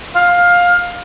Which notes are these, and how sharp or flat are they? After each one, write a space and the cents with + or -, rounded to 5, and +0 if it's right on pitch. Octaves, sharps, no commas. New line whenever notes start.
F5 +15